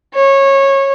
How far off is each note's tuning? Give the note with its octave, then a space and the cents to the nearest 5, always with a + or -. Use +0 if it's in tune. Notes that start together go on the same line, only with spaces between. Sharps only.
C#5 -20